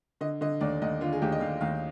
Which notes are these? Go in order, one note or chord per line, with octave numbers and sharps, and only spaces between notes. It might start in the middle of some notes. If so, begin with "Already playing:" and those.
D3 D#5
D3 D#5
D#2 D5
D#2 D#5
D3 F4
G#4
D#2 G4
D#5
D#2 F5
D#2 F5